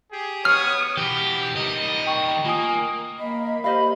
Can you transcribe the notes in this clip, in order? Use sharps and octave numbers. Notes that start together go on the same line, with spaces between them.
G4 G#4
B3 C#5 C#6 D#6 F6
B2 E3 G4
D#3 G3 D#5
G5 C#6
A#3 F4 G#5 D#6
A#3 D#5 B5
G4 C5 D#5 F5 B5